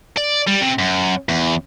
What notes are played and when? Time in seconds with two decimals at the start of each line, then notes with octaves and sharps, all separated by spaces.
0.17 D5
0.47 G3
0.61 C3
0.79 F#2
1.29 E2